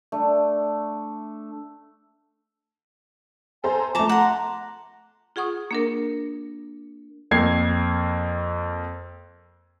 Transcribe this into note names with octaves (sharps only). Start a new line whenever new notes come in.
A3 D4
A4 C5 G#5 A#5
F3 A3 A5 A#5 D6
F#5 A#5 C6
F4 G#4 F#5 C#6 D#6
A#3 D4 A#4
F2 A#3 G#6 C7